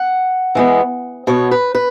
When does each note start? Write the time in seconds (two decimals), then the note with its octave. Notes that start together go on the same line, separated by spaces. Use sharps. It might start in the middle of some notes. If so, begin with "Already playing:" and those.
Already playing: F#5
0.55 E3 G#3 B3
1.27 B2 B3 C#5
1.51 B4
1.75 B4